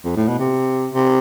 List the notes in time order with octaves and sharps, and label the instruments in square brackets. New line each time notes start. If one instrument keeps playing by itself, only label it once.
[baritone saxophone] F2
A2
B2
C3
C3